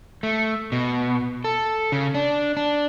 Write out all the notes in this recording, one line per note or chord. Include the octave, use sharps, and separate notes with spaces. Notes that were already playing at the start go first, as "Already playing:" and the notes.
A3
B2
A4
C#3
D4
D4